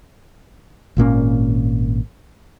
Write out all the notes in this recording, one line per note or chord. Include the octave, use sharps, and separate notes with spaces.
G#1 A#2 A#3 C#4